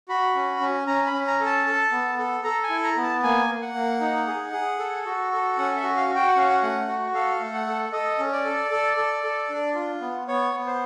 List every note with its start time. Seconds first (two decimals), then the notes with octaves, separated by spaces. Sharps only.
0.09 F#4 B5
0.35 C#4
0.61 C#4
0.87 C#4 A#5
1.06 B5
1.13 C#4
1.27 A#5
1.40 A4
1.46 A5
1.66 A4
1.92 B3
2.18 A4
2.44 A4 A#5
2.63 G#5
2.70 E4
2.83 A#5
2.97 B3
3.03 A5
3.23 A#3 G#5
3.49 A#3
3.62 F#5
3.74 A#3
4.00 D#4
4.27 G#4
4.53 G#4
4.79 A4
5.06 F#4
5.32 A4
5.58 C#4 F#5
5.76 E5
5.83 F#4
5.97 F5
6.09 F#4
6.16 G5
6.28 F#5
6.36 C#4 F5
6.50 F#5
6.63 A3
6.87 F#4
7.14 A4 F5
7.40 A3
7.54 F#5
7.67 A4
7.92 A4 D#5
8.19 C#4
8.32 D5
8.45 A4
8.71 A4
8.97 A4
9.24 A4
9.49 D4
9.75 F4
10.01 B3
10.27 B3 C#5
10.54 B3
10.66 C5